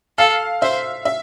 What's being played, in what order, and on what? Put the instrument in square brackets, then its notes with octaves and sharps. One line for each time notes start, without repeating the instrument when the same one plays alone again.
[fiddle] A4 [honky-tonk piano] F5
[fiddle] C5 [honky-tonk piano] E5
[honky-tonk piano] E5